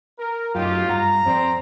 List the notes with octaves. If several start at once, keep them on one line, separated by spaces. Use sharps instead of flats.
A#4
F#2 A2 F#3 D#4 F4 G4
G2 F#5 A#5
F2 C4 D5